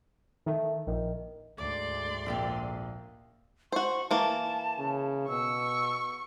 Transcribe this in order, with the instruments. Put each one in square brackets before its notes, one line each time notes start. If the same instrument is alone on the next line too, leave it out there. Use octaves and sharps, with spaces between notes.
[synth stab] D#3 [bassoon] A3
[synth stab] A#1 [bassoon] D#3
[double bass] D2 G#2 [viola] D5 C6 [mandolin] D6
[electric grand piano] A#1 A#3 [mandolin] C4 G4 D#5
[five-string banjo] F#4 C5 [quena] C#6
[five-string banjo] E3 A#3 [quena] A5
[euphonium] C#3
[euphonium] B2 [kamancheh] C#6 [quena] E6